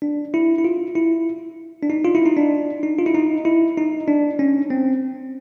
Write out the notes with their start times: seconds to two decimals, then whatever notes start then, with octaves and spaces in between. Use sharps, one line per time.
0.02 D4
0.34 E4
0.58 E4
0.65 F4
0.95 E4
1.82 D4
1.90 D#4
2.04 F4
2.15 E4
2.26 D#4
2.37 D4
2.83 D#4
2.98 F4
3.06 E4
3.15 D#4
3.45 E4
3.77 D#4
4.08 D4
4.39 C#4
4.70 C4